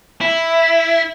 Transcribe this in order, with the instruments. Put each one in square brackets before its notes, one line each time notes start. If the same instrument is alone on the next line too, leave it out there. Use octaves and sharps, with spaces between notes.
[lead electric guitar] E4